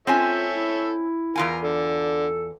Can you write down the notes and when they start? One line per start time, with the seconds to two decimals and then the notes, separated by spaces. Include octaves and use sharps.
0.07 C4 C#4 F4 A4 C#5 E5 G#5
0.54 E4
1.36 E2 F4 A#4 G#5
1.63 D3 A4